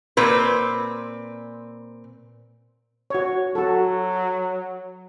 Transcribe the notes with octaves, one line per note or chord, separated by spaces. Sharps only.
A#2 C4 B4
F#4 C#5
F#3 F#4 A4